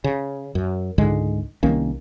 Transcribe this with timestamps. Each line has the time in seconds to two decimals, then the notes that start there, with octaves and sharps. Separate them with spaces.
0.04 C#3
0.55 F#2
0.98 C#2 G#2 D3 G#3
1.63 C2 D#3 A#3 C#4